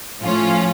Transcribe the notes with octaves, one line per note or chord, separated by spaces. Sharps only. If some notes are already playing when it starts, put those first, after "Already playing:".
A2 F3 C#4 F4